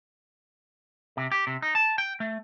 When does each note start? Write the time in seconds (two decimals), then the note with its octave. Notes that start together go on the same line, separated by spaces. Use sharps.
1.17 C3
1.32 G4
1.47 C3
1.62 D#4
1.75 A5
1.98 G5
2.20 A3